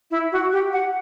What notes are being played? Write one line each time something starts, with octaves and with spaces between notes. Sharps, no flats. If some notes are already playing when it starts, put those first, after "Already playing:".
E4
F#4
G4
F#5